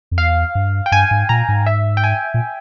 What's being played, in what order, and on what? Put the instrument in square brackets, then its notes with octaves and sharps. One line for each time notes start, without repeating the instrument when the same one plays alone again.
[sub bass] F2
[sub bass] E2 [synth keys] F5
[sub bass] G2
[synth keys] G5
[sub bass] G2 [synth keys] G#5
[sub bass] G#2
[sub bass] A#2 [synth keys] A#5
[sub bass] G#2
[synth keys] E5
G5
G#5
[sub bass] A#2